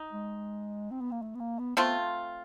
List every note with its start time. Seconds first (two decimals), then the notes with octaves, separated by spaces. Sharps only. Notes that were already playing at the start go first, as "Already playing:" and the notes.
Already playing: D#4
0.11 G#3
0.91 C4
1.01 B3
1.11 A#3
1.22 A3
1.35 B3
1.40 A#3
1.59 B3
1.77 A3 B3 C4 F4